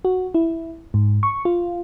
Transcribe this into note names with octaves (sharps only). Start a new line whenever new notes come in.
F#4
E4
G#2
C#6
F4